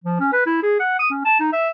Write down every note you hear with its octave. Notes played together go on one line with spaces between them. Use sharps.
F3
C#4
B4
E4
G#4
F#5
D#6
C#4
A5
D#4
E5